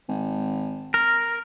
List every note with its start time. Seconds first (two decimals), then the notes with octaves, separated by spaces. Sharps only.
0.09 G#1
0.94 A#4